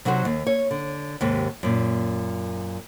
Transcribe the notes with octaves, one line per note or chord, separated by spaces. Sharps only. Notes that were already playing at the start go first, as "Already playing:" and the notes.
C3 F#3 D#4 F#4 A#4 C5
D#2
C#5
D3
D#2 G#2 C3
F#2 A#2